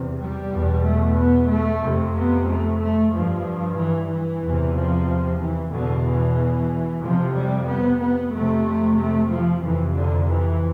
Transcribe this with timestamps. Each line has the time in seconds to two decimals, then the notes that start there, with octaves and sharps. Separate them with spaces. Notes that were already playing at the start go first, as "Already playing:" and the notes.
Already playing: E2 C3
0.20 G3
0.53 E2 B2
0.85 A3
1.17 B3
1.50 A3
1.83 F2 C3
2.15 B3
2.47 A3
2.80 A3
3.12 G2 F3
3.77 E3
4.10 E3
4.42 E2 C3
4.75 F3
5.40 E3
5.72 E2 B2 D3
6.05 E3
7.02 F2 C3 F3
7.35 G3
7.67 B3
8.00 B3
8.32 F2 C3 A3
8.97 A3
9.30 F3
9.62 F2 C3 E3
9.94 D3
10.27 E3